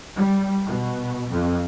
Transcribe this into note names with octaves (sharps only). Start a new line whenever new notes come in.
G3
B2
F2